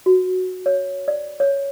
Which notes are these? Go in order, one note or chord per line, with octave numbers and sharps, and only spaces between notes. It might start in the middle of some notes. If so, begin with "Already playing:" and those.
F#4
C#5
D5
C#5